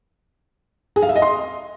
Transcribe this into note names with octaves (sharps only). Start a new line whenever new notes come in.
G#4
F5
E5
D#5
C6